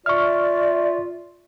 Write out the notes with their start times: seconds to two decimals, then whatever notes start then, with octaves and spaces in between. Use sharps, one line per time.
0.06 F4 D5 E5 C#6 F6